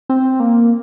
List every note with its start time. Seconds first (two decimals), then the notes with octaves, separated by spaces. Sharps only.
0.09 C4
0.40 A#3